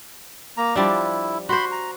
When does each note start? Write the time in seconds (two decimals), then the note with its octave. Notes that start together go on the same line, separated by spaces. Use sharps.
0.57 A#3 A#5
0.76 F3 G3 D4 E4
1.49 F#4 C5 B5 C6
1.71 A#5